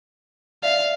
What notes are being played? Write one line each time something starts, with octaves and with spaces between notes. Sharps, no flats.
D5 E5 F5